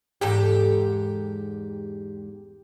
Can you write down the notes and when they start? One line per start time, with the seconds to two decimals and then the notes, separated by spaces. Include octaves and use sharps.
0.21 E2 G#2 G4 A4